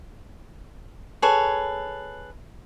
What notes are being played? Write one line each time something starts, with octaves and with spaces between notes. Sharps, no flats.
G#4 A4 B4 C#5